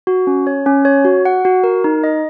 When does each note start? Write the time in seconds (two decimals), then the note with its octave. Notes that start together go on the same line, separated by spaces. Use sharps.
0.07 F#4
0.27 C#4
0.47 C#5
0.66 C#4
0.85 C#5
1.05 F#4
1.25 F#5
1.45 F#4
1.64 A#4
1.84 D#4
2.04 D#5